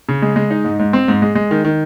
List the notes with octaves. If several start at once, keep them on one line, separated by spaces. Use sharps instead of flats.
C#3
G#3
G#3
D#4
G#2
G#2
C4
G#2
G#3
G#3
D#3
D#3